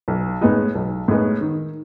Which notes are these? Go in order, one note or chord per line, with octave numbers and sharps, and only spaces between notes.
B1
A2 G#3 B3 D#4
B1
A2 G#3 B3 D#4
D#3